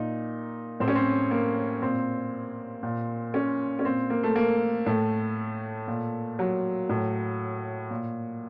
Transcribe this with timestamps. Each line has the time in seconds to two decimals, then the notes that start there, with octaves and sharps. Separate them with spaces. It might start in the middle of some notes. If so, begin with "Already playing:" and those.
Already playing: A#2 D#4
0.80 A2 C4
0.88 C#4
0.95 C4
1.31 A#3
1.82 A#2 C4
2.83 A#2
3.34 C#4
3.79 C#4
3.85 A#2 C4
4.10 A#3
4.23 A3
4.36 A#3
4.86 A2 A3
5.88 A#2
6.39 F#3
6.89 A2
7.91 A#2